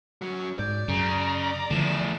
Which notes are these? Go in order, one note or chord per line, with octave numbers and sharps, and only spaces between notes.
F#2 F#3
G#2 D5 G6
F#2 C#3 A#5
E2 A2 D3 D#3 F3 E7